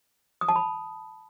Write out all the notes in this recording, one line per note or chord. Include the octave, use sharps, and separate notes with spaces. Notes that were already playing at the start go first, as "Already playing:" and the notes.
D#6
A5
B5